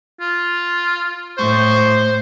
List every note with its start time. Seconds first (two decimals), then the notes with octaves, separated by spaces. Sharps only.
0.20 F4
1.39 A2 C5 C#6